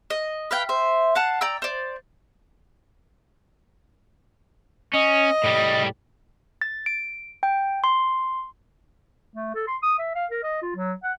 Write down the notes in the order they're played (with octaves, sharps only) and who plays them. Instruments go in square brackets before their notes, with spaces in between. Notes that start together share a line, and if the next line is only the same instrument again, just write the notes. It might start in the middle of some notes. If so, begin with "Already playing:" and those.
[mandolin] D#5
B4 F5 G5
C5 E5
F5 F#5 A5
D5 G5 A#5 E6
C5 D5
[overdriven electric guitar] C#4 [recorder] D#5
[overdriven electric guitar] A2 G3
[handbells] A6
D7
G5
C6
[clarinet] A3
A4
C6
D#6
E5
F5
A#4
D#5
F4
F#3
F#5